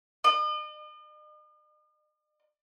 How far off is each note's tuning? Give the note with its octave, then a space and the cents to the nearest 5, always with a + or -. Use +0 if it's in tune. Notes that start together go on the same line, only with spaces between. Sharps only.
D#5 -45